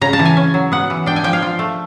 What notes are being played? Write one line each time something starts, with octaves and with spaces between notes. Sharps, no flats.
C#3 A#5
A5
E3
G#5
C#4
F#3
B3 F#5
E3
D4 G5
G#5
F3 G5
F5
F4
A3